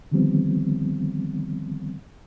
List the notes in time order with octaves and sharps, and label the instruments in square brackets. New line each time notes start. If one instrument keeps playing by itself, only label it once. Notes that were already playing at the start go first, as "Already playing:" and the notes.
[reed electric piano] D3 D#3 F3 G3 B3 C4